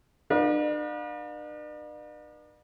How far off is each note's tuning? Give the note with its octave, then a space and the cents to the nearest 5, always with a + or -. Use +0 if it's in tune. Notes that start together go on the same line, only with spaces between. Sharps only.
D4 +45 B4 -40 F5 +35